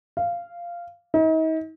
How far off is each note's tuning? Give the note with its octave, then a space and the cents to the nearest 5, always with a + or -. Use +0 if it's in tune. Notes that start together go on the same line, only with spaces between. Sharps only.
F5 -10
D#4 +40